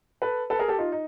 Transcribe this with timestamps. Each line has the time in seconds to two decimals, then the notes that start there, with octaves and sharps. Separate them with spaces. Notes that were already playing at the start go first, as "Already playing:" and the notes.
0.22 A4 B4
0.50 A4 B4
0.59 G#4 A#4
0.68 G4 A4
0.78 D#4 F4
0.92 D#4